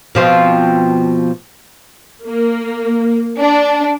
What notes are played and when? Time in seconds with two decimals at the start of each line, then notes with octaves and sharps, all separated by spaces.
0.15 B2 F3 C4
2.25 A#3
3.38 D4